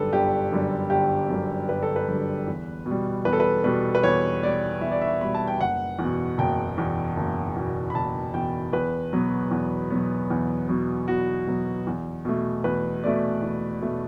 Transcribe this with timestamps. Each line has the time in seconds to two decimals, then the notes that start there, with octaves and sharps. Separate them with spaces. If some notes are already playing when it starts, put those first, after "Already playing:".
Already playing: G1 F#2 D3 G3 A4 B4
0.12 G1 G4
0.52 F#2 D3 G3
0.90 G1 G4
1.29 F#2 D3 G3
1.69 G1 B4
1.83 A4
1.96 B4
2.08 F#2 D3 G3
2.47 E2
2.86 B2
2.91 G3
3.25 E2 B4
3.33 A4
3.40 B4
3.64 B2 G3 B4
3.95 B4
4.03 E2 C#5
4.43 B2 G3 D5
4.81 E2 E5
4.92 D5
5.01 E5
5.21 B2 G3 B5
5.35 A5
5.48 G5
5.60 F#1 F#5
5.99 E2 B2
6.38 F#1 G5
6.78 E2 B2
7.17 F#1
7.56 E2 B2
7.90 B5
7.94 F#1 A5
8.34 E2 B2 G5
8.73 E2 B4
9.13 B2 F#3 B3
9.51 E2
9.90 B2 F#3 B3
10.30 E2
10.68 B2 F#3 B3
11.08 E2 F#4
11.47 B2 F#3 B3
11.87 E2
12.25 B2 A3
12.64 E2 B4
13.04 B2 A3 D5
13.42 E2
13.82 B2 A3